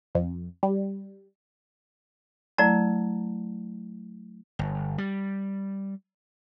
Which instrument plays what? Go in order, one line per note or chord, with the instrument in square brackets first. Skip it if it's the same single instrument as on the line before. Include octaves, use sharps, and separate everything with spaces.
[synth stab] F2
G3
[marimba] F#3 A3 E4 [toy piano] D5 A#5
[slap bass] G1
G3